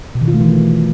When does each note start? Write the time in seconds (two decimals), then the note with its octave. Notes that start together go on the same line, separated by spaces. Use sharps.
0.15 B2
0.21 D#3
0.28 F4
0.34 A3
0.41 E3